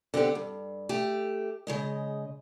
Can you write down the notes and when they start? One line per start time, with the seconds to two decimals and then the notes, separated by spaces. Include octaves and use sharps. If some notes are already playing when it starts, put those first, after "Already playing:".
0.14 D3 B3 C4 G4
0.35 G2
0.89 A3 G4
1.67 C#3 G#3 D#5